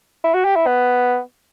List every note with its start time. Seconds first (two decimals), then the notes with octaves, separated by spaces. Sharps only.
0.24 E4
0.34 F#4
0.45 G4
0.56 E4
0.67 B3